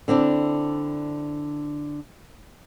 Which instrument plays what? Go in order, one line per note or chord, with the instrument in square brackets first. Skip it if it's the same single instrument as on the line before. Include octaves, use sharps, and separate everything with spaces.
[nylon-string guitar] D3 C4 D4 E4